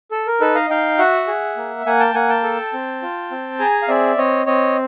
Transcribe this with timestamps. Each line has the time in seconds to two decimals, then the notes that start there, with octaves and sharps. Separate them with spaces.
0.11 A4
0.27 A#4
0.40 D#4 A4 B4
0.55 D#5 F5
0.70 D#4 F5 G5
0.98 F#4 E5 F#5
1.27 G#4
1.57 A#3
1.86 A#3 F#5 G#5
2.00 G5 A5
2.14 A#3 F#5 G#5
2.29 G5 A5
2.43 A4
2.73 C4
3.02 F4
3.31 C4
3.59 G#4 G#5 A#5
3.82 F5
3.88 C4 D5 E5
4.17 C4 C#5 D#5
4.46 C4 C#5 D#5